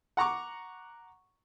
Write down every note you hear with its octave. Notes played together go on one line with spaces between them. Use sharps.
F#5 A#5 C#6 D6